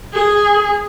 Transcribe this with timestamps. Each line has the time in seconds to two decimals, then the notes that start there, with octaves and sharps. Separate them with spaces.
0.14 G#4